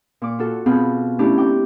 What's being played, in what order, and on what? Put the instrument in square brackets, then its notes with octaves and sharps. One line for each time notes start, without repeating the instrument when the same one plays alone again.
[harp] A#2 D6
F4 F#4 A4
B2 C4 F4 G#4 B5 G6
A3 C#4 D4 E4 G4
G5 D6